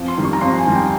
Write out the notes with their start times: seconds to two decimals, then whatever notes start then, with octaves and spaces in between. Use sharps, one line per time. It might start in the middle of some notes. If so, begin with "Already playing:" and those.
Already playing: F2
0.08 C6
0.17 D#3 G3
0.25 C#6
0.33 A#5
0.41 F2 C6
0.58 G#5
0.66 D#3 G3
0.75 G5